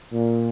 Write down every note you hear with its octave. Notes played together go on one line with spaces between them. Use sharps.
A#2